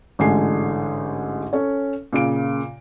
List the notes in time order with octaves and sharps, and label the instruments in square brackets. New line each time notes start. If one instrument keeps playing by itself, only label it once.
[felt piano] A1 G#2 D3 G#5 C7
C#4 A4 C#5
A#2 C#3 D7